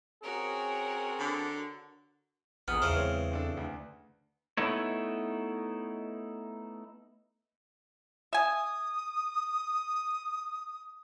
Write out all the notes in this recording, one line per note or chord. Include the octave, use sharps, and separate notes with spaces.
C4 C#4 F#4 G#4 A#4 C#5
D3
A#1 F2 B3 G#4 A#4 D#6 F6
E2 C#3 E3 C5 F6
G#3 C4 B4 C#5
C4 D4 A4
D2
A3 B3 D#4 E4 C#5
E5 G#5 D#6